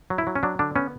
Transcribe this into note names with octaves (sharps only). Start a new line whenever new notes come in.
F#3
E4
F#3
C#4
F#3 D4
D3 D4
B3 C#4